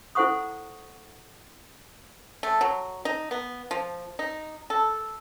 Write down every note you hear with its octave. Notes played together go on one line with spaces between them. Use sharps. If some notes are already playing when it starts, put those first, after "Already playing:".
E4 A4 C5 F#5 C#6 D#6
A3
F#3
D#4
B3
F3
D#4
A4